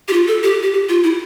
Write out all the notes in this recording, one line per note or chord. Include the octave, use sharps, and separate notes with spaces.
G4
F4
A4
G4
G4
G4
F4
E4